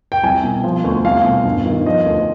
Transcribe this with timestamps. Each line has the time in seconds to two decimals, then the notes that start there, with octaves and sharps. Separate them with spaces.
0.12 G5
0.23 C2 G#5
0.44 B2
0.64 F3
0.84 D2
1.05 C2 F5
1.24 B2
1.45 G2
1.66 D#3
1.86 F3 D#5
2.06 D2